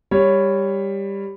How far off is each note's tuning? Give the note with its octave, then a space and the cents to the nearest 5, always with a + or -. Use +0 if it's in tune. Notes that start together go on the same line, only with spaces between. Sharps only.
G3 +15 C#5 +0